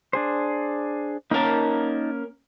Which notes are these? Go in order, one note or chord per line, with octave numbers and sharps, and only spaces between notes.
D4 G#4 C5
A#3 C#4 D#4 A#4 A5